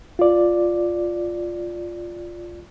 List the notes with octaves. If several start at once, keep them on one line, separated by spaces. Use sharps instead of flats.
F4 D5